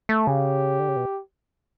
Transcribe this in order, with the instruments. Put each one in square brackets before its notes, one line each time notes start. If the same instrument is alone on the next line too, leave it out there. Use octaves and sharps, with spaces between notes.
[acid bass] A3
[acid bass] C#3 [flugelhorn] G4
[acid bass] D3
C#3
B2